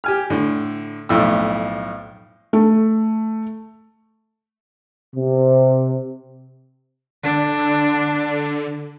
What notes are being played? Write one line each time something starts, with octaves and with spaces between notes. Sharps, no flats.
G4 G#5 F6
A2 D3
B1 F2 A2 E4 E6
A3
C3
D3 D4